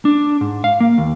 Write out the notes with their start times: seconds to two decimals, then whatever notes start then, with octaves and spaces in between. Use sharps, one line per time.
0.05 D4
0.41 G#2
0.64 F5
0.80 A#3
0.98 D#2